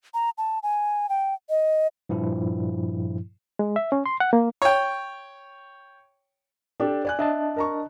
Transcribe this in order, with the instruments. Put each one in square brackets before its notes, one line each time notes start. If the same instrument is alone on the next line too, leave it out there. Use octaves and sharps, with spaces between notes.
[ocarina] A#5
A5
G#5
G5
D#5
[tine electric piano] G2 A#2 F3 E4
[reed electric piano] G#3
E5
C#4
C6
F#5
A#3
[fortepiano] C#5 G5
[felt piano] D4 G4 A4
D5 G#5 F#6
[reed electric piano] D4 D#5 A5 [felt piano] E5
[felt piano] A#4 A#5 C#6